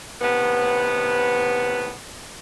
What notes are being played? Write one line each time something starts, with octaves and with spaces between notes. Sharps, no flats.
D#2 A2 C3 B3